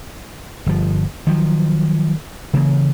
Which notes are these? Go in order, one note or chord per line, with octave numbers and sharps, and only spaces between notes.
G1 F3
D#3 F3 F#3
C#3 E3 A#3